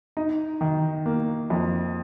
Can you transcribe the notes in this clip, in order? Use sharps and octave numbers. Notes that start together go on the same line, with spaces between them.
D#4
D#3
A#3
F2